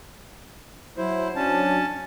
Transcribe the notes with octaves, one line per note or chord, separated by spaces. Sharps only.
F#3 E4 C5
F#3 C#4 D4 A5